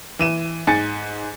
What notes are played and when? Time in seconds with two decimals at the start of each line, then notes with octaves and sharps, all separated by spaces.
0.19 E3 D#7 E7
0.67 G#2 G#5 A6 C#7